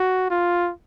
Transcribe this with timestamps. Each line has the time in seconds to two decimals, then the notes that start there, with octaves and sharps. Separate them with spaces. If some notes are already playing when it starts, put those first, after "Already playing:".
Already playing: F#4
0.30 F4